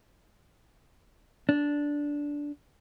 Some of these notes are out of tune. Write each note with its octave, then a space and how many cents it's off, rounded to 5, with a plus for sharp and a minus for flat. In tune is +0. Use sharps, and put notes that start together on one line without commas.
D4 -10